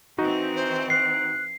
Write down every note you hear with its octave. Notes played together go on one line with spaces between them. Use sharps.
E3 C4 D#4 F#4
C5
F#6 C7